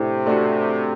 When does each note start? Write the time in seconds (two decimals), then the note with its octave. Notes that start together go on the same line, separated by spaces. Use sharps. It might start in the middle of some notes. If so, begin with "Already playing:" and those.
Already playing: A2 C3 A3 D4
0.26 A3 D4 F#4